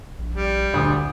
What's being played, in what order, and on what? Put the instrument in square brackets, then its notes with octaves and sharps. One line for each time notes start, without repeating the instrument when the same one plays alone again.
[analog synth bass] A#1
[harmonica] G3
[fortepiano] D2 D#6 [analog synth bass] A#2